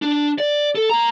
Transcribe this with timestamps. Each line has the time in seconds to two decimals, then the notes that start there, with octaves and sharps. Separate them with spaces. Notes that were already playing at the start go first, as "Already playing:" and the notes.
0.02 D4
0.38 D5
0.75 A4
0.90 A#3 A#5